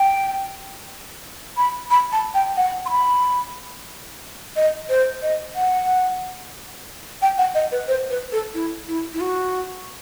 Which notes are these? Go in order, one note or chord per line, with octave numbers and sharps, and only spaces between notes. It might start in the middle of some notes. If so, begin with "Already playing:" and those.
Already playing: G5
B5
B5
A5
G5
F#5
C6
B5
D#5
C5
D#5
F#5
G5
F#5
D#5
B4
C5
B4
A4
E4
E4
E4
F#4